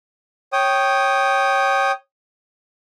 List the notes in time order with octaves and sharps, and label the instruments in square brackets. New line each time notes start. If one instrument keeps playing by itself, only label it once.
[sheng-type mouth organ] C#5 G5 D#6